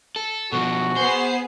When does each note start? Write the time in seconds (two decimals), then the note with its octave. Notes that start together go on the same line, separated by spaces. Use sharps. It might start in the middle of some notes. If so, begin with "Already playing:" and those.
0.16 A4
0.52 B2 F3 F#4
0.96 B3 G#4 C5 C7